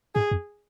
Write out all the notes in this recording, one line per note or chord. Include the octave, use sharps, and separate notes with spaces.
G#2 G#4
F2